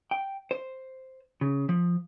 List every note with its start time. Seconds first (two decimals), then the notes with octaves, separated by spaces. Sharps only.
0.11 G5
0.51 C5
1.41 C#3
1.69 F3